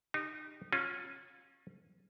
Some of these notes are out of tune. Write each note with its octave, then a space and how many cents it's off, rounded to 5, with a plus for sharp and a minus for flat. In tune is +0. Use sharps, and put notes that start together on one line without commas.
D#4 -25 G4 +0
C#4 -20 F4 +20